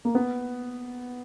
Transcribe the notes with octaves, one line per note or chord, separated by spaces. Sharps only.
A#3
B3